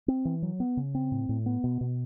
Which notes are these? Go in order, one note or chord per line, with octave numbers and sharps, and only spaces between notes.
C4
E3
F#3
B3
C#3
C4
A2
A2
B3
B2
B2